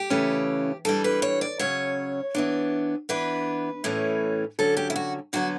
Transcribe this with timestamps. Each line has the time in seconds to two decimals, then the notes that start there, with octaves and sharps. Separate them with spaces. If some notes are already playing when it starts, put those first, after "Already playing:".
Already playing: G4
0.10 C#3 E3 A3 C#4
0.85 E3 G3 D4 A4
1.04 B4
1.22 C#5
1.41 D5
1.59 C#3 F#3 C#4 C#5
2.35 E3 B3 D4
3.09 E3 B3 D4 B4
3.84 A2 E3 A3 C#4
4.59 D3 F#3 C#4 A4
4.77 G4
4.90 E4
4.96 F#4
5.33 D3 F#3 B3 F#4